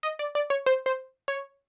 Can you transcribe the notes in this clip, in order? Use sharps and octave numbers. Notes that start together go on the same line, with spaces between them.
D#5
D5
D5
C#5
C5
C5
C#5